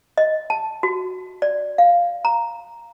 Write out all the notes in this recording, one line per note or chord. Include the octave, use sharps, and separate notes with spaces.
D#5
A5
F#4
D5
F5
A#5